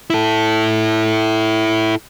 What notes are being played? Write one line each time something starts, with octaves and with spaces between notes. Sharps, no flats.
E4 A4